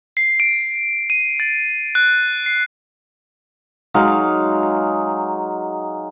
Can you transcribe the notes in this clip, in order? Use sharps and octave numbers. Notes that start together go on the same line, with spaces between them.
C7
D7
D#7
A6
F#6
C7
F#3 G#3 D#4 F5